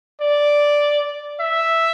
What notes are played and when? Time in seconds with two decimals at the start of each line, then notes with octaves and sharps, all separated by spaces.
0.21 D5
1.40 E5